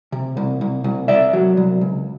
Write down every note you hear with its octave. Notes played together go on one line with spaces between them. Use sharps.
C3
C2
C2
C2
C2 D5 E5
F#3
C2
C#2